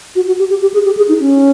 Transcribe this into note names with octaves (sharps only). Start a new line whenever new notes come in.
F#4
F#4
G4
G4
G4
G#4
G4
G#4
D#4
C#4